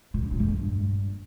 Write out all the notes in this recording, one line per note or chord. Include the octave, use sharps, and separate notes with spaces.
A#2
C#3
A#2
F2
G2